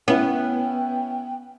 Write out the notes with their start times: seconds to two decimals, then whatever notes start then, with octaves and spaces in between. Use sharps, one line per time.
0.08 B3 C#4 E4 G5